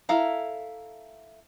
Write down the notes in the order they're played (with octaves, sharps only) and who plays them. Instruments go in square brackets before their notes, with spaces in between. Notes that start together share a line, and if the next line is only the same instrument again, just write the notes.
[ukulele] E4 A4 F5 A#5